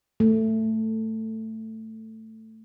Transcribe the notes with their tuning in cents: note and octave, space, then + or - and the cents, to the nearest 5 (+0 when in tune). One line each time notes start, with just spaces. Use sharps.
A3 +10